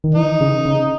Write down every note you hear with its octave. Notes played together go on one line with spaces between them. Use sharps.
D#3
E3 D#4
C#3
C#3